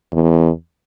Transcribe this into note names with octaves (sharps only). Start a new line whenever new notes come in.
E2